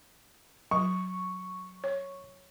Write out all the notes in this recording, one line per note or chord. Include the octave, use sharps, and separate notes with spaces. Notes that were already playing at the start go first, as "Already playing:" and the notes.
F#3 C#6
C#5